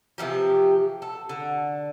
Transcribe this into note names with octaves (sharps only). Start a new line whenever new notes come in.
C3 E3 F3 G4
A4
D3